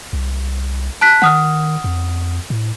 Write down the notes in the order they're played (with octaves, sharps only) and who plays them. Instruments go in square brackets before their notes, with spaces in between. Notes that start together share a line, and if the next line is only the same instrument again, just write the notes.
[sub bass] C2
[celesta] A5 F#6 B6
[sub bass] D#3 [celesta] F#5 D#6 F6
[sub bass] F2
A2